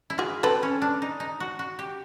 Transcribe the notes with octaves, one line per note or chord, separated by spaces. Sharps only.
E4
F4 F#4 G#4
C4 A4 B4
C#4
D4
D#4
D#4
F#4
F#4
G4